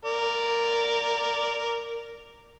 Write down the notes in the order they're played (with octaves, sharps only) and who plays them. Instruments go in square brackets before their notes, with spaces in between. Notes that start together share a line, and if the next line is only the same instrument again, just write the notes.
[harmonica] A#4 D5